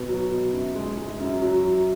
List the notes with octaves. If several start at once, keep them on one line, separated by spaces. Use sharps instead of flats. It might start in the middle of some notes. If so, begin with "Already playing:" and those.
Already playing: B2 B3
F#3
B2
F#2
G#3
G#3
F#2
F#3
F#3